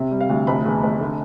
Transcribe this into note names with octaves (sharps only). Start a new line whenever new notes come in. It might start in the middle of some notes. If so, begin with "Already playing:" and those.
Already playing: C3
G3
F5
D2
F1 B5
E2
F1
D3